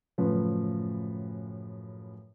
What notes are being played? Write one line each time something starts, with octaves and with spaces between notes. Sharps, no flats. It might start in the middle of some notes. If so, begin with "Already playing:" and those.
F#2 A2 C#3 F3 B4